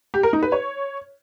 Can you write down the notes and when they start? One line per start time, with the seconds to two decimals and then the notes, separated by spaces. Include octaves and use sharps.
0.14 G4
0.23 A#4
0.33 D#4
0.43 B4
0.52 C#5